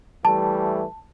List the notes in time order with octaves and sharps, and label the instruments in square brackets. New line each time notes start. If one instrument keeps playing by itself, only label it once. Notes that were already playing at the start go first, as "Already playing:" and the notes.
[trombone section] E3 G3 A3 [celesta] A5